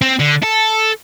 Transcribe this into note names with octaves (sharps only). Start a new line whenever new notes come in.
C4
D3
A4